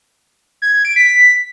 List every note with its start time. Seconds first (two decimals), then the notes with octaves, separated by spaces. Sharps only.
0.62 G#6
0.73 G#6
0.85 D7
0.96 B6